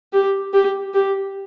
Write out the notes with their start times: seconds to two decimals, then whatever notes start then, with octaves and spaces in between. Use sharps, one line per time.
0.13 G4
0.53 G4
0.94 G4